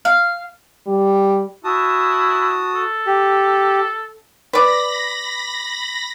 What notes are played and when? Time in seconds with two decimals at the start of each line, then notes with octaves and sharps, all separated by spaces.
0.05 F5
0.87 G3
1.64 E4 F#4 A5 D#6
2.74 A4
3.06 G4
4.53 B4 D5 B5 A#6